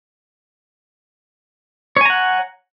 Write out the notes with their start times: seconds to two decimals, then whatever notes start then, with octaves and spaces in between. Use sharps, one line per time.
1.97 C#5
2.01 G#5
2.05 A#5
2.10 F#5